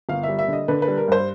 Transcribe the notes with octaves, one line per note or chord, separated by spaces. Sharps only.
G1 F5
G3 E5
E5
D3 D#5
D3 B4
B4
G3
A#4
G2 C5